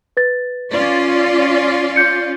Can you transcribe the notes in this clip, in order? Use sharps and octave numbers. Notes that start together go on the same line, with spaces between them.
B4 A6
C#4 F4 D5
G6 C#7